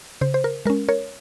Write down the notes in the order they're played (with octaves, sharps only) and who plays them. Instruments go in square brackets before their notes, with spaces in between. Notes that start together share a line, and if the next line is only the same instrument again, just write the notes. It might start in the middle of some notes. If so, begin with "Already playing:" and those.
[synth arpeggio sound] C#3 C5
C5
A#4
G#3 A#4
C#4
A#4 C#5